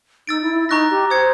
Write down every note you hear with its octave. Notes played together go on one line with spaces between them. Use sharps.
D#4 E6 A6 D7
E4
E4
D#4 A#5 C#6 F#6 A#6
G4
C5 D#6 G#6 C#7